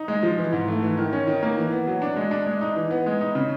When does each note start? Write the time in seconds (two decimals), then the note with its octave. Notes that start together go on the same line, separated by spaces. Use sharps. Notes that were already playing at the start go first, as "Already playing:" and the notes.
Already playing: D#4
0.08 G#3
0.23 F3
0.38 E3
0.53 G#2
0.68 A3
0.82 E3
0.97 D#3
1.13 C#4
1.27 D#3
1.43 A#3
1.58 E3
1.72 B3
1.87 F#3
2.02 D4
2.16 G#3
2.31 D4
2.47 G#3
2.61 D#4
2.76 E3
2.91 B3
3.06 G#3
3.21 D#4
3.35 C#3